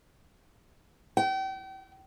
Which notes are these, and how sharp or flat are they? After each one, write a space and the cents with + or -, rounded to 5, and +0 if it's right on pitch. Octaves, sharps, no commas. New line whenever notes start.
G5 -35